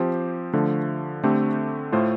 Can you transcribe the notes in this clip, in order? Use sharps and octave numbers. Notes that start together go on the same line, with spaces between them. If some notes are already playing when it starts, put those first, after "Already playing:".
Already playing: F3 C4 G4 C5
D3 F3 A3
D3 A3 C4 G4
A2 A3 F4 C5